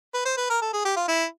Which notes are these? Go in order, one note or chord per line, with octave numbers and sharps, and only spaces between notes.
B4
C5
B4
A#4
A4
G#4
G4
F4
E4